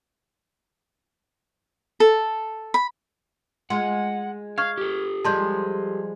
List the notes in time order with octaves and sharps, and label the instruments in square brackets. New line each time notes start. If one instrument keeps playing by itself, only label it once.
[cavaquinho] A4
B5
[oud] G#3 F4 [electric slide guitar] F#5
[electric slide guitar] F5 [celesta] C#6 F6 G#6
[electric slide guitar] G4 A4
[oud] F3 G3 G#3 [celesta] A5 C6 G6